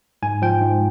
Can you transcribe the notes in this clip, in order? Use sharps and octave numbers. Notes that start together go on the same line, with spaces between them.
G#2 G#5
F3 G5
G#2